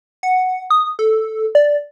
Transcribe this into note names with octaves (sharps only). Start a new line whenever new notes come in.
F#5
D#6
A4
D5